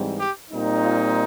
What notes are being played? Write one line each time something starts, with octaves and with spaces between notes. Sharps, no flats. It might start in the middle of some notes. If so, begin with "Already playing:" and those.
Already playing: G#2 E3 G3 C4
G4
A#2 G3 C4 D#4
F4